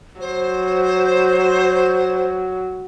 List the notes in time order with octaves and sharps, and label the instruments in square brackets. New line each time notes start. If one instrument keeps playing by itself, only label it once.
[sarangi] F#3 [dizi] C5